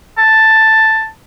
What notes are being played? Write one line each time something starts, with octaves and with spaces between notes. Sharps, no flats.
A5